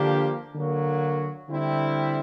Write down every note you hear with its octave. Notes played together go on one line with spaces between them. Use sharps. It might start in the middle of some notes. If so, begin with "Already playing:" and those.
Already playing: D3 F3 A#3 D4 G4
D3 F#3 A#3
D3 G3 C4 E4